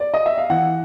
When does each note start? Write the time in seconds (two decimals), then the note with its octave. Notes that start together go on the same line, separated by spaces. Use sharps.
0.00 D5
0.14 D#5
0.26 E5
0.38 F5
0.50 E3 F#5